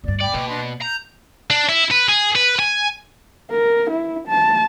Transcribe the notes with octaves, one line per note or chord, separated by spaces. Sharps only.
D1 G2 D5
D5 G5 B5 D6
B2 A#3
D4 B5 C6
D5
A#5 G6
D4
E4
B4
G#4
B4
G#5
A#4
E4
A5